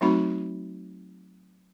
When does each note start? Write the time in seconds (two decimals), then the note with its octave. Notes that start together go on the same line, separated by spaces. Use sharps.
0.01 F#3 A3 C4 D#4 F#4 B5